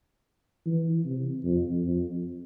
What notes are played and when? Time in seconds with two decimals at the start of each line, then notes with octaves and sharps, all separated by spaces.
0.66 E3
1.05 C3
1.45 F2
1.85 F2